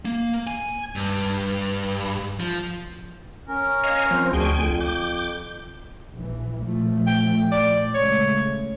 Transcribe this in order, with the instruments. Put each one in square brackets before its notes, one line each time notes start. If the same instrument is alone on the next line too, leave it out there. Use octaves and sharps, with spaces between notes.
[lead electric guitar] A#3
G#5
G2
F3
[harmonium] C#4 A#4
[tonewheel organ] C#5 D#5 F5
F3 C4
[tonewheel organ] D2 G5 G#5 [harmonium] D4 F#4 G#4
[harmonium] F2
[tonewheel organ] D6 G6
[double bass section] A#1 E3
A#2 F3 A3
[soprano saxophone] G5
D5
[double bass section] C#3 G#3 A3 [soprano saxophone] C#5